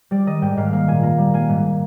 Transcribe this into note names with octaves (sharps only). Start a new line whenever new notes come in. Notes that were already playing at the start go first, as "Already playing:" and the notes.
G3 D5
D#3 D#5
G#2 G5
G#2 F5
A#3 F5
A#2 G#5
A#3 A#5
G3
A#3 G#5
G#2